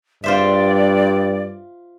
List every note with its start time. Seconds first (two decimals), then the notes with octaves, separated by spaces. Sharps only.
0.24 G2 F4 C5 D5 E5